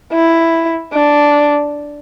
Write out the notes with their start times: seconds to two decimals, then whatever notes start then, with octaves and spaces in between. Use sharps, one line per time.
0.13 E4
0.93 D4